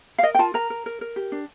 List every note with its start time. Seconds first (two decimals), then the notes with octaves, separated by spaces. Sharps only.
0.18 F5
0.23 A#4 D#5
0.35 G5
0.39 F4 A5
0.54 A#4 A#5
0.70 A#4
0.86 A#4
1.01 A#4
1.16 G4
1.32 D4